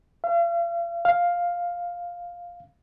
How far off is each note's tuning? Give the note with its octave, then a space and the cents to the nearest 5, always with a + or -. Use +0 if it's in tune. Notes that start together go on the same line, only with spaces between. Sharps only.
F5 -40
F5 +5